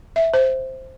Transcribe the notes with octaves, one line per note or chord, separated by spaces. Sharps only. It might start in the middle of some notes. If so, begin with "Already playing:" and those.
E5
C5